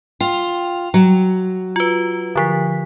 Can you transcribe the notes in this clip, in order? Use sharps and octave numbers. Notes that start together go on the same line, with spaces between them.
F4 G5 F7
F#3
F4 B4
D3 F3 B6